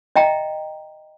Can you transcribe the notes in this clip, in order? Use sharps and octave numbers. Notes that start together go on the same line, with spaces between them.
D#5 E5 G5 A#5